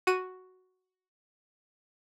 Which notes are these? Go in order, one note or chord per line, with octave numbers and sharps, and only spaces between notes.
F#4 D#7